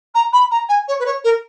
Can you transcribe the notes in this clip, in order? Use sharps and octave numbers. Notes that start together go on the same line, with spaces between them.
A#5
B5
A#5
G#5
C#5
B4
C#5
A#4